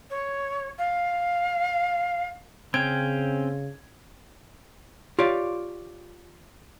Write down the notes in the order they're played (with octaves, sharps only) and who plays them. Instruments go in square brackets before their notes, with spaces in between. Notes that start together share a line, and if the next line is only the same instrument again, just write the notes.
[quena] C#5
F5
[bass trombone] C#3 [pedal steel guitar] C4 C#4 G5 [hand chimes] G#6
[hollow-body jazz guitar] F4 G4 C#5 D5 F5